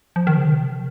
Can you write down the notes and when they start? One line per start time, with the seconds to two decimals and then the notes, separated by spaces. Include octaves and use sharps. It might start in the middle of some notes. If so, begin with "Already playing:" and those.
0.16 F3
0.27 D#3
0.37 C#3
0.49 C3